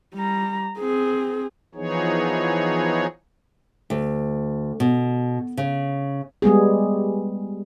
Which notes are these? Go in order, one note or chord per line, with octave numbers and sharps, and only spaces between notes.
G3 A#5
C4 G#4
E3 F3 B3 D#4 G#4 C#5
D2
B2
C#3
G3 G#3 B3 G#4